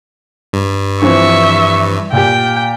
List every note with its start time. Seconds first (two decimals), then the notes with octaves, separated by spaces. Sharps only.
0.53 G2
1.02 E3 F3 C4 E5 C#6
2.12 A#2 G4 G5